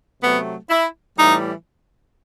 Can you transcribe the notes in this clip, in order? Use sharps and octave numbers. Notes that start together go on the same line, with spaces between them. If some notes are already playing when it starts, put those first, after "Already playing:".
C3 F#3 A3 B3
E4
A2 E3 G3 D#4